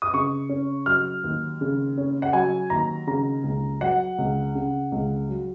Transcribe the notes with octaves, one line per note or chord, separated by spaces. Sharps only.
D#6
C#3 C#6
C#4
F#3 F6
D#2
C#3
C#4
F#5
F#3 G#5
D#2 A#5
C#3 A#5
C#2
F#3 F#5
C#2
C#3
C#2
F#3